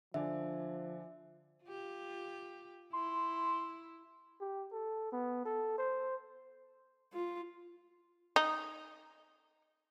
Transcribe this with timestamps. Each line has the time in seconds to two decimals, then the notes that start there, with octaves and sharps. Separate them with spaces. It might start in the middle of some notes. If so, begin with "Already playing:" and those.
0.14 D3 F3 D5 E5 G#5
1.64 F4 G4
2.93 E4 C6
4.40 G4
4.71 A4
5.12 B3
5.45 A4
5.78 C5
7.13 F4
8.36 D#4